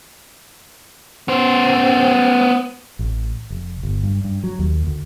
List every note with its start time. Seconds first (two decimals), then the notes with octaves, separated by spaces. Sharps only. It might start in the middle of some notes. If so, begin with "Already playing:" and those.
1.28 B3 C5
2.99 A1
3.50 F1
3.83 G1
4.03 G2
4.24 G2
4.44 F#3
4.59 D#2
4.87 D2